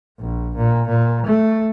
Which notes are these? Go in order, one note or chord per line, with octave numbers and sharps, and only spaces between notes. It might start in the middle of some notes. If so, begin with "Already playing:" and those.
A#1
A#2
A#2
A3